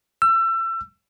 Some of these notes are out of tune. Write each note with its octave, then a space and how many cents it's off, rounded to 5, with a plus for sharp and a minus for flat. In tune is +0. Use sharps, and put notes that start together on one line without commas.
E6 +30